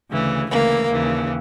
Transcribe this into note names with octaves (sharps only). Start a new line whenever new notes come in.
D2 C#3 E3
D2 C#3 E3 A#3
D#2 C#3 E3